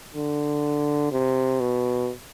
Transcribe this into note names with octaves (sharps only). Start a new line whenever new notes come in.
D3
C3
B2